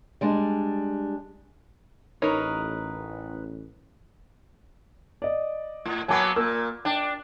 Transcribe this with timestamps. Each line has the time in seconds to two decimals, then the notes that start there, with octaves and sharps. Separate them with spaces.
0.21 G3 G#3 D4
2.22 A1 D#4 A#4 B4 C#5
5.22 D5 D#5
5.85 A2
6.08 F#3 A#3 B3 G#5 A5 D6
6.36 A#2 A#3 E6
6.85 D4 G5